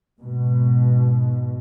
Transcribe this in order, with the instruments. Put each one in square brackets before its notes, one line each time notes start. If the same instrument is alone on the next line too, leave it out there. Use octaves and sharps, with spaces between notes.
[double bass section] G#2 B2